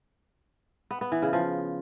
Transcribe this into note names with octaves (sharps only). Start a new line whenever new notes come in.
B3
B3
E3
C#3
F3